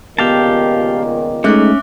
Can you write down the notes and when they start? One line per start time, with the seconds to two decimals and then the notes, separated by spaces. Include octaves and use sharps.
0.19 C#2 A#2 D#3 B3 G4 F5 A5 D6
1.44 G#3 A3 C#4 D#4 E5 D6 F#6